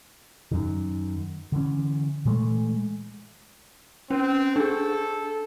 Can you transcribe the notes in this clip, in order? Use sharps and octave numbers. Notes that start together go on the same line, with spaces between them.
F#2 D#3
D3 E3 C#4
A#2 E3 G#3 A3
C4 C#4
D4 G#4 A4